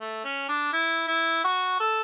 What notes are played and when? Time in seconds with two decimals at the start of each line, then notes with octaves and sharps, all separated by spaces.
0.01 A3
0.24 C#4
0.48 D4
0.73 E4
1.07 E4
1.44 F#4
1.80 A4